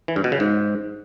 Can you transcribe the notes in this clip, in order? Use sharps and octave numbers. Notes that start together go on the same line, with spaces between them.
E3
G2
B2
C#3
G#2